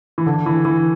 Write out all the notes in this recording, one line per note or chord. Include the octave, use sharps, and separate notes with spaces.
E3
D3
E3
E3